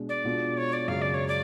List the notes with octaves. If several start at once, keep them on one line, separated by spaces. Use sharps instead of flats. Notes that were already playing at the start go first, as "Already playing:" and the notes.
Already playing: B2 G#3 D4
D5
B2 G#3 D4 F4
C#5
D5
F#2 C#3 G#3 F5
D5
C#5
D5